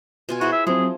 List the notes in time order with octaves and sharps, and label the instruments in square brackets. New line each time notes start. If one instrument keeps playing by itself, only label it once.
[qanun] B2 F4 G#5
[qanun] E4 G#4 C5 [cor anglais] F#4
[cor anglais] E5
[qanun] F3 [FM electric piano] F#3 C4 [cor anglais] G#4